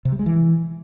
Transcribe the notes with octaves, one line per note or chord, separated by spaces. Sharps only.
C3
G3
G#3
E3